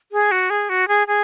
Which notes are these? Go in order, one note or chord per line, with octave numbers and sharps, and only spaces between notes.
G#4
F#4
G#4
F#4
G#4
G#4